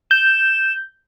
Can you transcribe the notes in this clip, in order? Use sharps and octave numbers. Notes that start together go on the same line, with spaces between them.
G6 E7